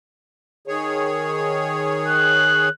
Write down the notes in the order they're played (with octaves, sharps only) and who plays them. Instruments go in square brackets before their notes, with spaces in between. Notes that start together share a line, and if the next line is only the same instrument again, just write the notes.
[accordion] D#3 G#4 C#5
[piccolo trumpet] F#6